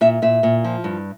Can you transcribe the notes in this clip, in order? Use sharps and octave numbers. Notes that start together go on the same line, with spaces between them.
A#2 E5
A#2 E5
A#2
F3
G2